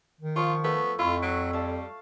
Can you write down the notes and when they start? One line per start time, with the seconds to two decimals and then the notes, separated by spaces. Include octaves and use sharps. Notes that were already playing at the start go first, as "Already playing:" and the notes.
0.21 D#3
0.36 F3 F4 C#6
0.64 A3 B3
0.99 F2 E4 F4
1.22 F#3
1.53 G3 F5 A5